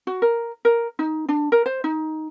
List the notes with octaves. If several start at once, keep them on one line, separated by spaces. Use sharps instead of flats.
F#4
A#4
A#4
D#4
D4
A#4
C5
D#4